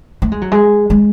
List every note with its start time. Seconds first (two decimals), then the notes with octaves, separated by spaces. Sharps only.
0.22 A3
0.32 G#3
0.41 F#3
0.52 G#3
0.90 G#3